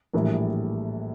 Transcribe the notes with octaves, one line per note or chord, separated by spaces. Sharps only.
A#1 A2 E3 G3 A#3